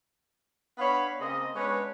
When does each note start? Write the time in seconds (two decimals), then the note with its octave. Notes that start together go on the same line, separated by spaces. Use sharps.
0.78 B3 D4 C#5 F5 B5
1.20 C#3 A#3 C4 D#5
1.55 G#3 B3 C#4 D4 B4 C#5